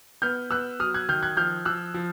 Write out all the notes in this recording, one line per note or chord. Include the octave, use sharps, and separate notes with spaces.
B3 F6 G6
B3 E6 F#6
F#3 D#6 F6
F#6 G#6
D#3 F6 G6
F#6 G#6
F3 F6 G6
F3 E6 F#6
F3